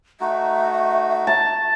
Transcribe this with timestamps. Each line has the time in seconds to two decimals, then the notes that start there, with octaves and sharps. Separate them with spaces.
0.21 A3 D#4 F#4 E5
1.27 A5